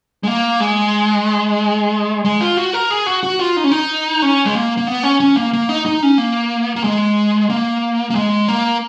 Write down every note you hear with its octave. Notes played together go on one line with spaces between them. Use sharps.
G#3
A#3
G#3
G#3
F4
F#4
A#4
G#4
F#4
F#4
F4
D#4
C#4
D#4
C#4
G#3
A#3
A#3
B3
C#4
C#4
A#3
A#3
D#4
D#4
C#4
A#3
A#3
G#3
A#3
A#3
G#3
A#3